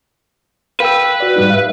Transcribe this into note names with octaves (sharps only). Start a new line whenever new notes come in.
B4 F5 G5 E6
F#4 D5
G#2 G3 D#4
E5 F5